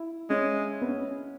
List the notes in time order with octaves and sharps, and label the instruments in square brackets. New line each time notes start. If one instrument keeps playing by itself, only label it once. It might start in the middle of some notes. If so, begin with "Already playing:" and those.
Already playing: [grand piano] E4
[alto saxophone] G#3 [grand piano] C#4
[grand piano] B3
C#4